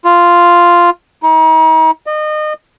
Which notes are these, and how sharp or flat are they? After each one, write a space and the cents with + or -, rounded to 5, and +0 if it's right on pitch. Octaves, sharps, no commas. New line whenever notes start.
F4 -5
D#4 +40
D#5 -30